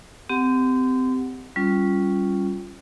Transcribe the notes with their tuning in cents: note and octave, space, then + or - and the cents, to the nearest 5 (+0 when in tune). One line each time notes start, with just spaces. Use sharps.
C4 -30 G4 +0 F#5 +0
G3 -5 C#4 +0 F4 +0